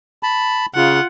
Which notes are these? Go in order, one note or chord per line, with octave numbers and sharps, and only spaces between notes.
A5 B5
C#3 F4 F#5